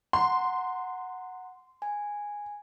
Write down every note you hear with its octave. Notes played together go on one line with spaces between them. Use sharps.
F#5 A#5 C6
G#5